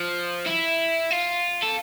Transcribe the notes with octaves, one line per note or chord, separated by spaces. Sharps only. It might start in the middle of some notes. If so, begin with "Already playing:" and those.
Already playing: F3
E4
F4
A4